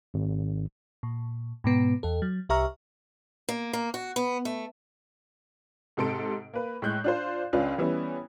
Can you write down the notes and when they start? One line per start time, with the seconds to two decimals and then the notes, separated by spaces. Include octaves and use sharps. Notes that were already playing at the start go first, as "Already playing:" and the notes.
0.14 G#1
1.03 A#2
1.64 G#2 B2 B3
2.03 E2 A4
2.22 F#3
2.49 C2 G4 E5 A#5 C#6 F6
3.49 A#3
3.73 A#3
3.94 F#4
4.16 B3
4.45 A3
5.97 G#2 C3 A4 C6 D7
6.54 A#3 B4
6.82 A2 G#3 F#6 G6
7.04 D4 F4 C5
7.53 C#2 C#4 D4 F4 B4
7.78 E3 G3 B3 C#4 E4